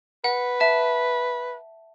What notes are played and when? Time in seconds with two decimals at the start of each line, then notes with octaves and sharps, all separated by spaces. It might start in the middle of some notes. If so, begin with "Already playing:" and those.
0.24 B4 F#5
0.60 E5 A5